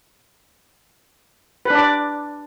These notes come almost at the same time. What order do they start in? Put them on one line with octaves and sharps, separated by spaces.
B4 D4 D5